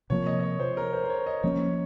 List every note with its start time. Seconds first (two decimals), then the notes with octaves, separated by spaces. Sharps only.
0.10 C3 F3 A#3 C#5
0.26 D#5
0.40 D#5
0.43 C#5
0.60 C5
0.77 A#4
0.93 C5
1.04 C5
1.09 C#5
1.26 D#5
1.43 F3 A#3 C#4 C#5